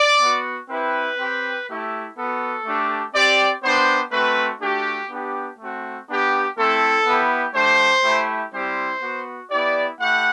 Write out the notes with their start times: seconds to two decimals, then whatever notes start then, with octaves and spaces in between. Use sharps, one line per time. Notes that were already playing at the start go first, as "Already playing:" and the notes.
Already playing: D5
0.21 B3 F#4
0.69 C4 E4 G4 B4
1.19 C4 G4
1.67 A3 E4 G4
2.16 B3 F#4 A4
2.66 A3 D4 G4
3.14 C4 G4 D5
3.64 B3 D4 G4 C5
4.12 A3 C4 F#4 B4
4.61 A3 D4 F#4 G4
5.11 B3 D4 G4
5.59 A3 C4 F#4
6.08 B3 D4 G4
6.57 A3 C4 E4 A4
7.06 B3 E4 G4
7.55 A3 D4 G4 C5
8.04 A3 E4 G4
8.53 G3 C4 E4 G4 C5
9.02 B3 F#4
9.51 B3 E4 G4 D5
10.00 A3 E4 G4 F#5